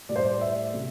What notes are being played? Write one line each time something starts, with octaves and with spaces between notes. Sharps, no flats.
A2 G3 D5
C5
D5
E5
C3 A3